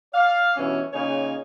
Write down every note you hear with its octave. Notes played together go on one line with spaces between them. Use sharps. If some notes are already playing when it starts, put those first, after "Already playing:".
D5 F5
G2 B2 E3 C#4 C#5
A#2 C#3 D#4 C#5 G#5